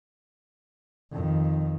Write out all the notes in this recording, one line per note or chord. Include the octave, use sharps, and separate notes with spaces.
F2 D#3